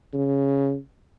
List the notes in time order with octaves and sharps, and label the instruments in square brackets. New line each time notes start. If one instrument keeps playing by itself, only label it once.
[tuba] C#3